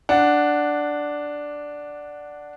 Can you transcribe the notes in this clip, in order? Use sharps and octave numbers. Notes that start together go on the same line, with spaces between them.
D4 F#5